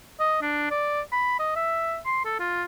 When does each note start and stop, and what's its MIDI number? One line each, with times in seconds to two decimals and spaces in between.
0.20 0.38 75
0.42 0.67 62
0.71 1.01 74
1.12 1.38 83
1.39 1.51 75
1.56 1.98 76
2.06 2.22 84
2.25 2.38 69
2.40 2.63 65